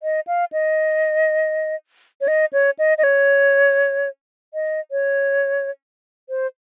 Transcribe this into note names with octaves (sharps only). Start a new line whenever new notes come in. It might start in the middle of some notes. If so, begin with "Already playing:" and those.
D#5
F5
D#5
C#5
D#5
C#5
D#5
D#5
C#5
D#5
C#5
C5